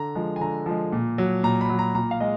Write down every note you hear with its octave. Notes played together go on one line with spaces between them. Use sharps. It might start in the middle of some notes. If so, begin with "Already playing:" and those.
Already playing: D3 A#5
F3 G#3
G#5
D3 A#5
F3 G#3
A#2
F#3
A#2 A#5
B5
F#3
A#5
A#2 A#5
F5
G#3 D#5